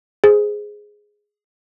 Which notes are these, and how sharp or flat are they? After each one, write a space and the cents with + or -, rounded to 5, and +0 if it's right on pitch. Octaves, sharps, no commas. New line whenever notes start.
G#4 +0 C5 +0